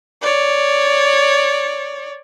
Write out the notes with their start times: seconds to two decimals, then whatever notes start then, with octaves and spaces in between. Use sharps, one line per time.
0.22 C#5 D5